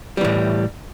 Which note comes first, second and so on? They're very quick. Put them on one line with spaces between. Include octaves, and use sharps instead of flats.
G3 E3 A2